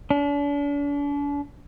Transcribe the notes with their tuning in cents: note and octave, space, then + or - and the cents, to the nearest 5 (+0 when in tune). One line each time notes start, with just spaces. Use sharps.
D4 -40